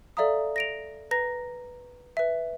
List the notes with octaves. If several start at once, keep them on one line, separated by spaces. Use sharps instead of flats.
A4 D5 E5 F5 A#5 D#6
A#6 D7 F7
B4 A#5 A#6
B4 E5